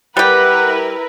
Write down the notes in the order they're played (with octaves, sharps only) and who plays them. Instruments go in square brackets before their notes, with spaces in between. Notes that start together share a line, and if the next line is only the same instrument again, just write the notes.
[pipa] G3 G4 [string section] E4 A#4 B4 [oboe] F#5